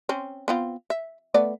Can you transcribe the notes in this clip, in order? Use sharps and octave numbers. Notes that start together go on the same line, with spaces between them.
C4 C#4
B3 C4 F4
E5
A3 B3 D5